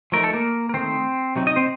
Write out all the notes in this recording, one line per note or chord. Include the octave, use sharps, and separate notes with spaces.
F3 A3 D#4 A#4
A4
A#3 A#4
A#4
D#3 A3 C4 D#4 C5
C3 F#3 C4 D#4
D#4 D#5
C4 C5